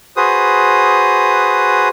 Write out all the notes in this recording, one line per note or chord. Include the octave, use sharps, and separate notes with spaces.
F#4 G#4 B4 C5 D#6